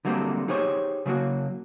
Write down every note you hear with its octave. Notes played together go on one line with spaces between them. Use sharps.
D3 F#3 G3 A3 A#3 C4
D#4 G4 G#4 C5 C#5
C#3 F#3 A#3 F#4